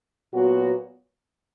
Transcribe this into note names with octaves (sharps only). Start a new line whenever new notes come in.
A#2 F#3 B3 F#4